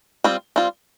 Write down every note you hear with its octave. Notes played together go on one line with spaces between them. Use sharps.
G3 C4 F4
G3 C4 F4